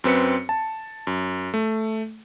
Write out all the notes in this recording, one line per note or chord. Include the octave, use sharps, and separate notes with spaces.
F#2 C4 B4 C#7
A5
F#2
A3